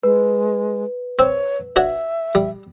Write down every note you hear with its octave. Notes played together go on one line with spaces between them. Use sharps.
G#3 B4
C4 C#5
D4 F#4 C#5 E5
G3